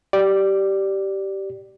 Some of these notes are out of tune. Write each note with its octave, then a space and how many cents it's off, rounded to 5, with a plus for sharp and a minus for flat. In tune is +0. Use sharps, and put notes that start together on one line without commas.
G4 -15 D5 +0